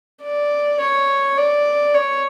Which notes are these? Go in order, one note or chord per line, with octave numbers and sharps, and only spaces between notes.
D5
C#5
D5
C#5